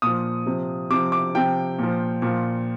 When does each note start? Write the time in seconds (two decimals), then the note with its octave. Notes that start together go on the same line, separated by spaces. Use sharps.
0.02 A#2 F3 D#6
0.46 C3 F3
0.90 C3 F3 D6
1.12 D6
1.35 C3 F3 G5
1.78 A#2 F3
2.22 A#2 F3